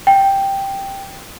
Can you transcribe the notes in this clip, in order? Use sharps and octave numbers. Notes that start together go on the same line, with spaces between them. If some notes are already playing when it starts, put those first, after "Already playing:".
G5